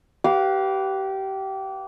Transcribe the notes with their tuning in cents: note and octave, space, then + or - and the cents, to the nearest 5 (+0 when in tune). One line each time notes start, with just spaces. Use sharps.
G4 -25 B4 +0 F5 +0